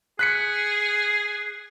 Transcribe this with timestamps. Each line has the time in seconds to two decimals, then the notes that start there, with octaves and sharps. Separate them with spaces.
0.19 G#4 F#6 B6 C#7